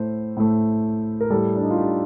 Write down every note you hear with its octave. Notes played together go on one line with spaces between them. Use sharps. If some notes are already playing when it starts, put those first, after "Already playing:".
Already playing: A2 A3 C5
A2 A3
A#4
A2 G3 A4
D4
D#4
F4
G4